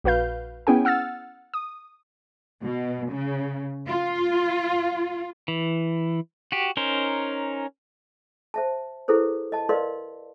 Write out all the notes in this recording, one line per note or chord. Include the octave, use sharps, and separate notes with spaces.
A#1 F#4 B4 F5 G6
B3 C#4 E4 G#4 G5 G#5
F#5 E6 F6 A6
D#6
B2
C#3
F4
E3
F#4 G4
C#4 D#4 A#4 C5
C5 E5 A5
E4 G#4 A4 B4 C5
D#5 A5
A#4 B4 D5 D#5 F5 C6